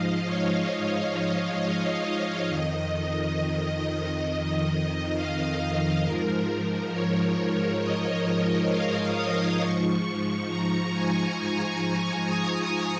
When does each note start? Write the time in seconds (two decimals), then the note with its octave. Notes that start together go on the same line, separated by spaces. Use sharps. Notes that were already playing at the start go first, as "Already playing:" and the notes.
Already playing: G#2 F3 D#5 F5
0.26 C#5
1.59 D#5
2.49 F2 D#3
5.15 F5
5.60 D#5
6.04 G#2 F3 A#4
6.49 A#4
6.93 C#5
7.82 D#5
8.71 F5
9.17 D#6
9.61 G#2 F3 C#6
10.50 A#5
10.94 G#5
11.39 G#5
12.28 D#6